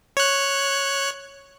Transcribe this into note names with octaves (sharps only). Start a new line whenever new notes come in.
C#5 F#6